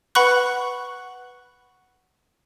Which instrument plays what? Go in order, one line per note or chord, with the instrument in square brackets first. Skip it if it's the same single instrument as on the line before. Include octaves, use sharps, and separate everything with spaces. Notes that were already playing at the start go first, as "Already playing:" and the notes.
[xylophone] B4 F#5 B5 C#6 F#6